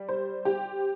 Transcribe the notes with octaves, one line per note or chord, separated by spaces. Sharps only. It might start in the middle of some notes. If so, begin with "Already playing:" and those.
Already playing: G3
C5
G4